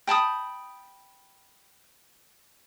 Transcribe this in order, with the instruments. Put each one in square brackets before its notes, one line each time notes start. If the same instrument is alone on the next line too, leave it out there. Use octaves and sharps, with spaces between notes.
[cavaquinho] G5 A5 B5 D#6